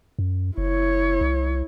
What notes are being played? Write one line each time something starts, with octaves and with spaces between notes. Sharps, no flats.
F#2
F#1 E4 C#5
C2